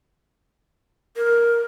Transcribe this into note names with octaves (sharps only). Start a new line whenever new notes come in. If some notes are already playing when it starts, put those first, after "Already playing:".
A#4